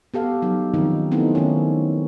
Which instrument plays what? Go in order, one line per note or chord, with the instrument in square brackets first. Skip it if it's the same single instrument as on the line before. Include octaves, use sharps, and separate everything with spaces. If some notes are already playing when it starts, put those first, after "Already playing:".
[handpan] B3 G4 A4 F5
F#3 D#4
D#3 F3 F#3 C4 C#4 D#4
A3 B3 C4 D#4 E4 A4
D#3 C#4